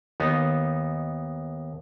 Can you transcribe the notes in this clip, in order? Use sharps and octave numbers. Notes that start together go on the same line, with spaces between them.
D#2 B3 D#4